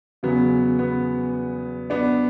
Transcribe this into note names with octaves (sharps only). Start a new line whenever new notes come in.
E2 C#3 F#3 B3
B3
B3 D4